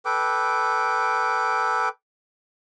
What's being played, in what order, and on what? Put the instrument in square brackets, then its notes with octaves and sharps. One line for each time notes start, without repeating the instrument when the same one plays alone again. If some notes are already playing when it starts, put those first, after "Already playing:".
[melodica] A4 B4 G5 D6